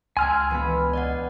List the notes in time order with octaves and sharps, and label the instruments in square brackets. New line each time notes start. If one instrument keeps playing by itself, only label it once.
[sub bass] C#2 [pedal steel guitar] G#5 F6 [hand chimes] C6 E6 G#6
[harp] E1 B3 B6
[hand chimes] D5 D#5 F#5